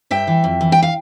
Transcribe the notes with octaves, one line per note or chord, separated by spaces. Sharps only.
G2 E5 G5
E3
F2
E3
G5
F5